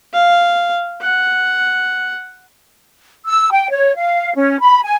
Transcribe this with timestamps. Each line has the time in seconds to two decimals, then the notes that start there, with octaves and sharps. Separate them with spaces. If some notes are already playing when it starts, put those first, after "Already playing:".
0.13 F5
1.02 F#5
3.27 E6
3.52 G5
3.70 C#5
3.97 F5
4.36 C#4
4.61 B5
4.83 G#5